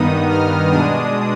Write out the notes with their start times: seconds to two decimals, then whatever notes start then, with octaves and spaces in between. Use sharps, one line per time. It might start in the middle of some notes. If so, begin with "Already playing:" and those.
Already playing: G2 D#3 B3 D#4 D#6
0.29 F6
0.71 B2 G#3 D4 D#6